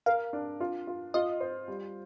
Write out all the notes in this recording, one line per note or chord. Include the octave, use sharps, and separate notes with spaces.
A#4 F5
D4
F4
F4
F4 D#5
C5
G3